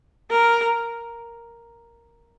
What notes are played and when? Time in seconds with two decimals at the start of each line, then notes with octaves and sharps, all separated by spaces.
0.31 A#4